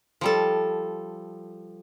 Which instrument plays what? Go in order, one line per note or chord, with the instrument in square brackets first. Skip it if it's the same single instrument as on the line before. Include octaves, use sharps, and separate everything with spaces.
[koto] F3 G3 A4